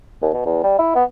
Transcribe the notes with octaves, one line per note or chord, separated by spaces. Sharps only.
D#2
B2
E2
G3
E4
B3